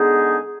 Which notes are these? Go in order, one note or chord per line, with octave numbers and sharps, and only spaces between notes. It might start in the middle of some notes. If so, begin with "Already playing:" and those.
Already playing: D3 G#3 B3 D#4 G#4